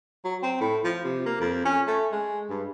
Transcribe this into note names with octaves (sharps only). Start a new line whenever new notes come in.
F#3
C4
A2
F3
C3
A#3
F2
C#4
A3
G#3
G2